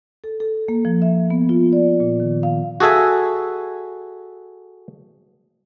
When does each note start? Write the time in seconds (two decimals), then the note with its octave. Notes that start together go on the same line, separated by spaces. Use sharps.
0.24 A4
0.40 A4
0.68 A#3
0.85 F3
1.02 E5
1.30 B3
1.49 F4
1.73 D5
2.00 A#2
2.20 D#3
2.43 F5
2.80 F#4 G#4 A4 E5 G#5